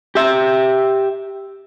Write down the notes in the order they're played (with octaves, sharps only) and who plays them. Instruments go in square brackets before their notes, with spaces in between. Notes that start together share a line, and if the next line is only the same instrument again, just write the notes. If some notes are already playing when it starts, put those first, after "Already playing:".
[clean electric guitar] G4 E5